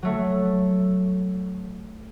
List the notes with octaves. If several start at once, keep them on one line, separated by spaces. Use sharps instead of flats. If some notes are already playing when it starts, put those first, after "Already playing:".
F#3 A3